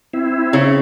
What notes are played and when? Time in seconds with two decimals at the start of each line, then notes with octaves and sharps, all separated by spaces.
0.13 C4 E4
0.53 C#3